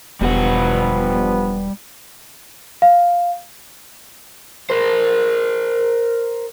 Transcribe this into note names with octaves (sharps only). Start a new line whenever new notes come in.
E1 G2 B2 F3 G3 B3 G4 F#5
F5
A#4 C5